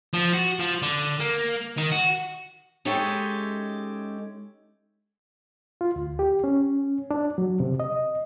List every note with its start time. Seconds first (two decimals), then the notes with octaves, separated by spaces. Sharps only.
0.13 F3
0.34 F#4
0.59 F3
0.82 D3
1.20 A#3
1.77 D#3
1.92 F#4
2.85 G#3 C#4 D#4 G4 A4 E5
5.81 F4
5.96 D2
6.19 G4
6.44 C#4
7.11 D4
7.38 F#3
7.60 C3
7.80 D#5